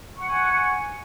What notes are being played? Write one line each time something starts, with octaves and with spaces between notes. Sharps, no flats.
F#5 G#5 C#6